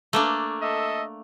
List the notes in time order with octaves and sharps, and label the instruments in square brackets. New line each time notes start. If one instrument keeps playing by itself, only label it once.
[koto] A3 A#3 D4
[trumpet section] A4 D#5 E5